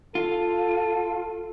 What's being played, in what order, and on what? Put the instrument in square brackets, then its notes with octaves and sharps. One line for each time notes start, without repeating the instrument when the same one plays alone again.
[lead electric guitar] F4 [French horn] A4